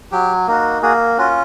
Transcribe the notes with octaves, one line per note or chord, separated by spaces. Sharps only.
F#3 G4
A#3 D#4 F#4
A#3 F#4 G#4
C#4 F4 F#4